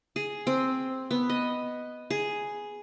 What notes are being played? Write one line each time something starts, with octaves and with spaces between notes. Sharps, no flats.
G#4
C4
B3
D#5
G#4